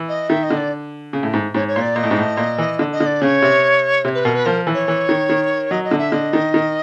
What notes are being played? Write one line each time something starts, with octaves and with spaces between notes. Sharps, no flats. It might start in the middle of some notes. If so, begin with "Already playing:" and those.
Already playing: E3
D#5
D#3 E5
D#5
D3
D5
C#3
A2
G#2
G#2 C#5
C#5
A#2
D5
A#2 D#5
A2
G#2
A2
A#2
E3
D3
D#5
D3
D5
C#3 C#5
C3
C3
B4
B2 A#4
B4
F3 A#4
E3
C#5
E3
D#3
D#3
F#3 D#5
D#5
D3
E5
D3 D#5
D#3
D#3